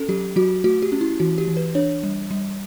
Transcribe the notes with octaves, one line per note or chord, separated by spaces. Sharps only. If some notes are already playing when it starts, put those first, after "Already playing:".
Already playing: C#4 A4
F#3 G4
F#3 F#4
A3 F#4
G4
C#4
E4
E3 F#4
G4
E3
B4
D4 C#5
G3
G3